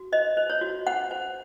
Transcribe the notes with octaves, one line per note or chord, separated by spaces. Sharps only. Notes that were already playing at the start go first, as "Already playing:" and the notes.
Already playing: F#4
C5 D#5
C5
C#5
F#4
C5 F#5
C5